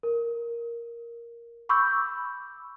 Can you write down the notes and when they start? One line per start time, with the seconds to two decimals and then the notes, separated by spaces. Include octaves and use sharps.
0.03 A#4
1.69 B5 C#6 D6 E6 G6